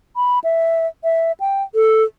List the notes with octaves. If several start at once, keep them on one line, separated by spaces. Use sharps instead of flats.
B5
E5
E5
G5
A4